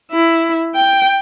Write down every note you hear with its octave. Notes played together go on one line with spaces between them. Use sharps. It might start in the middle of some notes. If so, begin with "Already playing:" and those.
E4
G5